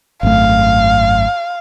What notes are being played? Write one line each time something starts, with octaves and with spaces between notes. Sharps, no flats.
G#1 F#2 A3 F5